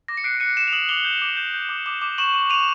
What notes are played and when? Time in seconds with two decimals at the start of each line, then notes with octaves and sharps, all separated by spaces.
0.08 D6 A#6
0.17 C#7
0.24 F#6 C7 D7
0.40 F#6 C#7 D#7
0.57 F#6 D7 E7
0.67 F7
0.72 D#6 E7 F#7
0.89 D6 F7 G7
1.05 G6
1.22 D6
1.37 G6
1.54 G6
1.69 D6
1.86 D6
2.02 D6
2.18 C#6 E7 F#7
2.34 C#6
2.50 C#6 D#7 F7